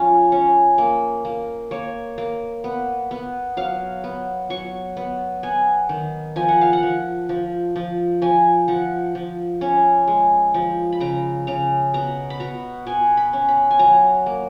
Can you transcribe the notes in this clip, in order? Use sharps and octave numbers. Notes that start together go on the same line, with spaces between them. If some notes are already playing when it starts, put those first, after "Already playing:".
Already playing: F3 C#4 F4
C#4
A#3
A#3
A#3 C#5
A#3
B3
B3
F#3 F5
B3
F#3 C#6
B3
B3 G#5
D#3
F3 G#5
F#5
F5
F#5
F3
F3
F3
F3 G#5
F3 F#5
F3
C#4
G#3
F3
B5
C#3 A#5
C#3 A#5
B2 A#5
B5
B2 A#5
B2 G#5
B5
C#4
B5
G#5
F#3 A#5
A#3